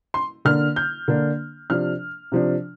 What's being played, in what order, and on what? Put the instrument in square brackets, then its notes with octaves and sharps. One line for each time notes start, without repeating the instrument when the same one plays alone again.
[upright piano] C6
D3 A#3 D4 F6
G6
D3 A#3 D4
C3 F3 D4 F6
C3 F3 D4